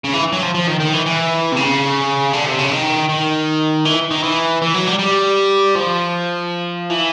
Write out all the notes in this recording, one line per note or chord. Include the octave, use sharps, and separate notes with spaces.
C#3
E3
F#3
F3
F3
D#3
D#3
E3
E3
C3
C#3
D3
C3
C#3
D#3
D#3
E3
D#3
E3
E3
F#3
G3
G3
F3
E3